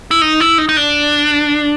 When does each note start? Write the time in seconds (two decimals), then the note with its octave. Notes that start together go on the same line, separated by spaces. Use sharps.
0.11 E4
0.22 D#4
0.40 E4
0.58 D#4
0.69 D#4
0.77 D4